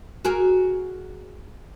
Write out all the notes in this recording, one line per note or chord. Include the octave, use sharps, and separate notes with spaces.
F#4 G#4 A#4